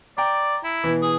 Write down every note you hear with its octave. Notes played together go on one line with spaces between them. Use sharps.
D5 G5 A#5
E4
B2 E3
G#4